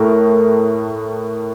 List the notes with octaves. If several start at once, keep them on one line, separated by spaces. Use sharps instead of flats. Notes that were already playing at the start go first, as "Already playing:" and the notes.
Already playing: A2 A3 A#4